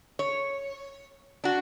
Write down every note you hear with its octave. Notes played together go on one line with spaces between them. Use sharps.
C#5
D4 F#4